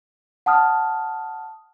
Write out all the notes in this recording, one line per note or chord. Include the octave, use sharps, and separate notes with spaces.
F#5 A5 D#6 F6